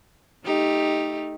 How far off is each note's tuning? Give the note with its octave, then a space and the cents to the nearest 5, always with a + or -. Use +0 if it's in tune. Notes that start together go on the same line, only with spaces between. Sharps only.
A3 +0 D#4 +0 G4 +10